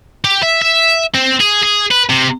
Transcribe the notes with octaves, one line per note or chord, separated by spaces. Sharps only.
G4
E5
E5
C4
G#4
G#4
B4
C3